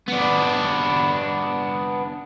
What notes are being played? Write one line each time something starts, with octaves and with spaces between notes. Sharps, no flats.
B3 D4